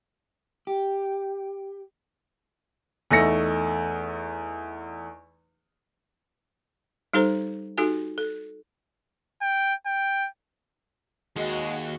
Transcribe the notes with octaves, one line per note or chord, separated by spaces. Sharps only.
G4
E2 A3 D#4 E6 A#6 C#7
G3 D#4 G4 A4 C5 A#5
D#4 F#4 G4 A4 G#5
A4
G5
G5
D#2 G#3 F#4